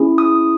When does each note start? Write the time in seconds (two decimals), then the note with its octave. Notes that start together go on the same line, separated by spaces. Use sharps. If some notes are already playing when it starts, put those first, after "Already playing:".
Already playing: C#4 E4 G#4
0.18 D#6